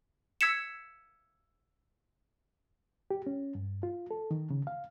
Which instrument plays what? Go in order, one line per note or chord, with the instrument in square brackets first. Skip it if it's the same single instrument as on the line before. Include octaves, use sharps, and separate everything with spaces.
[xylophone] E6 G#6 B6 C#7 E7
[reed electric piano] G4
C#4
G2
F4
A4
D#3
C#3
F5